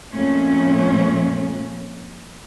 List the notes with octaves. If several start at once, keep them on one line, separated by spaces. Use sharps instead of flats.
F2 A#2 A3 C#4